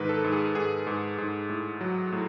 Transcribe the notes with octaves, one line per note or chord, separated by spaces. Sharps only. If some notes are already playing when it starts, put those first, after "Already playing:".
Already playing: G#2 D#3 A#4 B4
A4
G#2
G#4
G#2 G#4
G#2
G#2
A2
F#3
A2